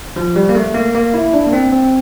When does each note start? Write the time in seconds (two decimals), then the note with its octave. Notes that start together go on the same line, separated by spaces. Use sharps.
0.16 F3
0.36 G3
0.49 A#3
0.55 A3
0.74 A#3
0.94 A#3
1.14 E4
1.33 D4
1.47 A#3
1.53 C4
1.73 C4